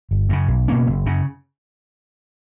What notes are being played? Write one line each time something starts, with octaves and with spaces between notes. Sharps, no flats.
G1
F#2 C#3
B1
B2 A#3 C#4
F#1
F#2 C#3